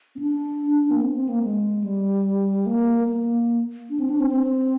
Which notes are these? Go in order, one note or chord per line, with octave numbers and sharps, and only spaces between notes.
C4
D4
A#3
C4
C4
A#3
G#3
G3
A#3
A#3
D4
C4
D4
C4
C4